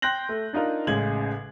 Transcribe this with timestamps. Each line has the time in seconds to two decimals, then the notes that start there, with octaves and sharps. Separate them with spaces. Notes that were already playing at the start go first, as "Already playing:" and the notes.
0.02 G5 C6 F#6 G6 A#6 F#7
0.29 A3
0.53 D4 D#4 F4 A#4
0.87 A1 C#3 G#3 G#6 F#7